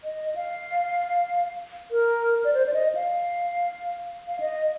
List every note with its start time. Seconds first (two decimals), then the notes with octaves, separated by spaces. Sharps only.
0.04 D#5
0.35 F5
1.91 A#4
2.44 D5
2.54 C5
2.66 D5
2.74 D#5
2.95 F5
4.28 F5
4.40 D#5